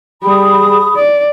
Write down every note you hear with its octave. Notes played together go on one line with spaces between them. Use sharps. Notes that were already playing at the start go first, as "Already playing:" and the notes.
G3 G#4 B5 D#6
D5